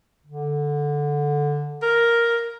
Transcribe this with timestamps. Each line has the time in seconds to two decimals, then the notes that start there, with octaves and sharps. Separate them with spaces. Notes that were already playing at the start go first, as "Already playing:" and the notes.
0.27 D3
1.82 A#4